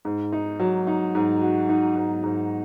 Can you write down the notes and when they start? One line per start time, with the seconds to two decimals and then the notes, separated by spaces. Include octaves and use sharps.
0.05 G#2
0.32 D#4
0.60 F#3
0.87 D#4
1.15 G#2
1.42 F#4
1.69 D#4
1.95 G#2
2.23 G#2